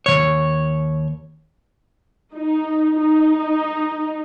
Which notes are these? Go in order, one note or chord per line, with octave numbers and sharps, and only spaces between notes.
D#2 C#3 C#5
D#4
D#4